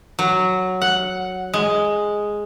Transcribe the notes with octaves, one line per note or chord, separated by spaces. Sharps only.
F#3
F#5
G#3